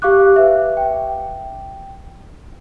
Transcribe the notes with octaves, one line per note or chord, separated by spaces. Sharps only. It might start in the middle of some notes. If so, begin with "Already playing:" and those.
G4 F5 C#6 D6 F#6
B4 E5
G5